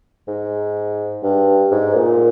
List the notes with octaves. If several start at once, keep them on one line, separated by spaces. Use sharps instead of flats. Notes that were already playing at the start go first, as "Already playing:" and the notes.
G#2
G2
G#2
A#2